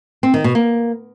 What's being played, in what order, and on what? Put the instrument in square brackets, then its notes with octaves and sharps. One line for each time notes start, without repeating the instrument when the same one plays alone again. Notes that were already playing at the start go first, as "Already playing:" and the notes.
[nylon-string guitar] C4
D#3
B2
A#3